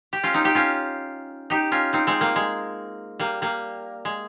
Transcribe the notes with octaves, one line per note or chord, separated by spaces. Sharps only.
G4
C#4 F4
C4 D#4
D#4 G4
C#4 F4
D#4 G4
C#4 F4
C4 D#4
G#3 C4
G3 A#3
G#3
G3 A#3
G3 A#3
G#3